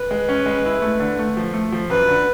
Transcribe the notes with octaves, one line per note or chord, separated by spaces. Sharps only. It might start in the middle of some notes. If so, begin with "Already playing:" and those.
Already playing: B4
G#3
C#4
G#3
E4
A3
D3
A3
F3
A3
F3
F#2 B4
D3